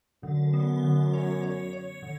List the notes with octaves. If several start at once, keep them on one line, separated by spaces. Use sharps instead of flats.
F#2 D3
B3
D3
C#5
C#5
C#5
D3